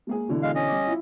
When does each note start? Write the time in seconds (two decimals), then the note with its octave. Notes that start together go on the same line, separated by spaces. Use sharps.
0.07 G#3 A#3 G#4
0.28 B2 D3 E3
0.43 G#3 F5
0.55 C#4 D#5
0.68 G3 D6
0.87 E4 F4